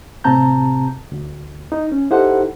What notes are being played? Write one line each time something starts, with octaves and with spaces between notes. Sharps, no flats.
A2 C3 C4 A5 A#5 G6
D2
D#4
C#4
D#4 E4 G4 A4 C5 F#5